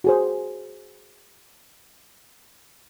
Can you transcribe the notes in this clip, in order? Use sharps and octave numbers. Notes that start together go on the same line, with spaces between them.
F#4 G#4 C5